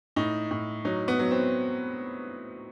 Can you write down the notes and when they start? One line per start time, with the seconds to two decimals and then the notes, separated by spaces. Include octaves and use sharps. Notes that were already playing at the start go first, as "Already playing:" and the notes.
0.16 A2 D#4
0.51 A2
0.85 F#3 D#4
1.08 B3
1.19 F#3
1.31 C4